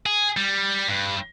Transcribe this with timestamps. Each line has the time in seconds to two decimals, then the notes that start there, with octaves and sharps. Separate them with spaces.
0.06 G#4
0.37 G3
0.88 G2